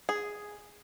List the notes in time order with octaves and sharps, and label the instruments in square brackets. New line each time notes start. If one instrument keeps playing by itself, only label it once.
[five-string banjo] G#4